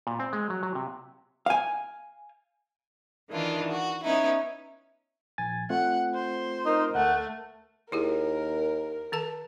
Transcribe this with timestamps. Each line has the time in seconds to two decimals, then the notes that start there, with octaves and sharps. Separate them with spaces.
0.07 A#2
0.20 C4
0.33 G#3
0.50 F#3
0.63 F#3
0.75 C3
1.46 F5 G#5
3.30 D#3 E3 D4 F4
3.69 F#4
4.03 B3 C#4 D#4 E4
5.38 A#1 G#5 A6
5.70 A3 C4 F4 F#5
6.14 C5
6.65 D#4 A#4
6.95 D2 A3 F#5
7.92 D#2 E4 G4 G#4 A#4
9.12 D#3 A4 A5